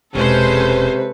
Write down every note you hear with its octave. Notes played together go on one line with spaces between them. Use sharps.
E1 C3 G#3 C#4 A4 B4 C5